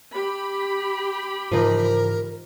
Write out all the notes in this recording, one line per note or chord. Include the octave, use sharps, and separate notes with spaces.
G4 B5
G#2 C#3 E3 F3 D#4 A#4